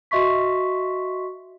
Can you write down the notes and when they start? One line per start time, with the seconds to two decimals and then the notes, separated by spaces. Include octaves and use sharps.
0.11 F#4 D#5 E5 C6 C#6 B6